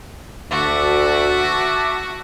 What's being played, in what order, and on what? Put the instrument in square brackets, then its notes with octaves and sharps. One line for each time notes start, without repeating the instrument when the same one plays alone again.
[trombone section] D2 [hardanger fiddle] F#4 [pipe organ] E5 A5 D6